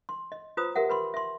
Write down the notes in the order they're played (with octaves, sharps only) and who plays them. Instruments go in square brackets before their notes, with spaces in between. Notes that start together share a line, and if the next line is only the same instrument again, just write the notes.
[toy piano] C6
D#5
F4 B4 C5 A#5 D#6
G4 A#4 E5 F#5
B4 B5 C6
E5 C6